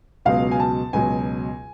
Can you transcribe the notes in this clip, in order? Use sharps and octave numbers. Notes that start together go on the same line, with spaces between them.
C#2 B2 F#3 F5
G#5
A5
C#2 B2 F#3 G#5